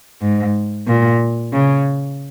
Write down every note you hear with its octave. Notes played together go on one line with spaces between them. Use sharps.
G#2
A#2
C#3